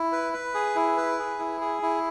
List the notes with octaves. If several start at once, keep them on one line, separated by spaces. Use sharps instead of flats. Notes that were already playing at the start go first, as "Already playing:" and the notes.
Already playing: E4
B4
B4
G#4
E4
B4
G#4
E4
G#4
E4